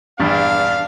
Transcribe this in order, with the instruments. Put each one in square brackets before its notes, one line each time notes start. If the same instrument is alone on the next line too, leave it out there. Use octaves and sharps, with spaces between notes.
[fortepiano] A#1 E2 G2 [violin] D4 [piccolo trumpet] F5